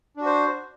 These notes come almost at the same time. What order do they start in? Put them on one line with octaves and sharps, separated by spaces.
D4 F#4 C5